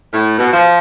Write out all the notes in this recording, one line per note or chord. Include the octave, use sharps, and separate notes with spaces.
A2
B2
F3